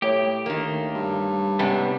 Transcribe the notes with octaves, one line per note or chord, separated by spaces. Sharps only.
A2 A3 G4 C#5
D2 D#3 A#3
G2
G#2 C3 G3 B3 C#4